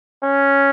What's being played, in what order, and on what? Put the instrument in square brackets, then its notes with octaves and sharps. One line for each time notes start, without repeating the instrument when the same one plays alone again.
[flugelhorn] C#4